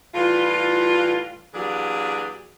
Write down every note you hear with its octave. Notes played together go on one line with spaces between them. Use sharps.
A2 E3 G3 F4
E3 F#3 A#3 D4 G4 G#4